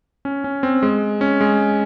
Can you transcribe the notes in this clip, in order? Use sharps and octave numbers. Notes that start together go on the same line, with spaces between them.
C#4
C#4
C4
G#3
C#4
G#3